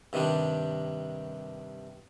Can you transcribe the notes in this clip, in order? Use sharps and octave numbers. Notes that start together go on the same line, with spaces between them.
G2 C3 D#3 G3 D4